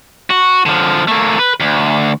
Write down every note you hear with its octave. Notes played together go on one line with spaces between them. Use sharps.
F#4
D3 F3
A3 A#3
B4
D2